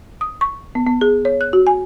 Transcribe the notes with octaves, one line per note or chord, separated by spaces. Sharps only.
D#6
C#6
B3
B3
G#4
C#5
F#6
F#4
G#5